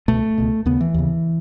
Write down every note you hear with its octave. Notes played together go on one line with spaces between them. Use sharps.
C#2 B2 A3
C#2 B2
D#2 C#3 B3
E3
D#2 C#3